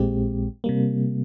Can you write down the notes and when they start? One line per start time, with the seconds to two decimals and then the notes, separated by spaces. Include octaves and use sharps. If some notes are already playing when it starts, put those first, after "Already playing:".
Already playing: A#1 A#2 G#3 C4 G4
0.64 C3 G3 A#3